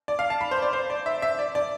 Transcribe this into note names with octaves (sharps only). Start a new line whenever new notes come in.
D5
F5
A5
B5
C5
D5
C5
D5
E5
E5
D5
D5